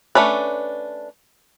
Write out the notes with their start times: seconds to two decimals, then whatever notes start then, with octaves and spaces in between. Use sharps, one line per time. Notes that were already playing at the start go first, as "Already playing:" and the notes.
0.15 A3 C#4 D4 B4